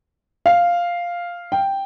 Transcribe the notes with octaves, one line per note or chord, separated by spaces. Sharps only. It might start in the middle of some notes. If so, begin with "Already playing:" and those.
F5
G5